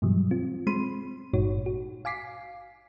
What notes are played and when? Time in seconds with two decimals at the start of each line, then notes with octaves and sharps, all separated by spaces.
0.02 G2 B2 E3 F#3 G3
0.31 C4 F4
0.67 G#3 C4 B5 C6 D#7
1.33 G#1 G2 A#2 D#4 F#4 C#5
1.66 F#4
2.05 F5 G#5 D6 B6 C7